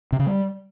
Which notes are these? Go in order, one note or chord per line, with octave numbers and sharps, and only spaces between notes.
C3
C#3
G3